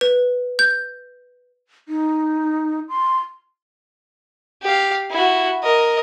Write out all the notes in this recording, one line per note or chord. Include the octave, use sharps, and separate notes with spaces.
B4
G6
D#4
C6
G4 F5
E4 F#4
A#4 D#5